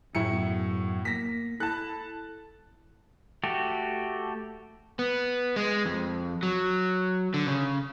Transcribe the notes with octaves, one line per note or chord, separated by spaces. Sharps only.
F#2 A2 F#3 E4 G#4 C#7
B3
A#3 A#6 B6
E4 A4 A5 F#6
A3 F#4 G4
B3
G#3
F2
F#3
D3
C#3